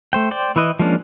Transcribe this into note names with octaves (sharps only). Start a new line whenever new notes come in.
A3 C5 G5
C5 D5 G5
E3 E4 B4 D#5
F3 G#3 A#3 C#4 D4